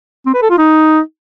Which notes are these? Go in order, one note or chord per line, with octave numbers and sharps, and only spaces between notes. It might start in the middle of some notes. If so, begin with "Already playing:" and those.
C4
B4
A4
F4
D#4